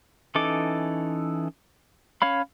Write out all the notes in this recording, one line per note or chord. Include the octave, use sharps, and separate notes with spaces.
E3 C#4 D#4 A4 D6
C#4 C#5 F5 B5